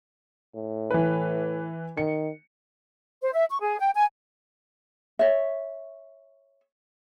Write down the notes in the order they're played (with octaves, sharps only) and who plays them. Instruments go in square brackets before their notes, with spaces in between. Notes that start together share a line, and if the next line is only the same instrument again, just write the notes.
[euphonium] A2
[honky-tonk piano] E3 B4
[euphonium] D#3 [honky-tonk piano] C#7
[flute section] C5
E5
C#6
G#4
G5
G#5
[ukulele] C#5 E5